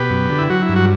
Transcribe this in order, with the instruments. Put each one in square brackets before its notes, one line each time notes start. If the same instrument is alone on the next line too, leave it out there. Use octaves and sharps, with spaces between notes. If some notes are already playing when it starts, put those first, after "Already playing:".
Already playing: [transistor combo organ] B2 G4 B4
F#2
D3
E4
F#3 F#4
E4
G2
F#4